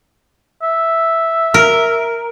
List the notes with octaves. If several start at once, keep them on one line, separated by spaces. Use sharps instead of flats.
E5
A#4